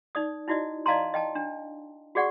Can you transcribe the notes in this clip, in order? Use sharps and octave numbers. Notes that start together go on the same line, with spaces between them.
D#4 D5 D#6
D#4 E4 F#4 D5 D#5
D5 D#5 F5 A5 A#5 C6
D#5 G5 A5
D4
F#4 G#4 D5 F#5 C#6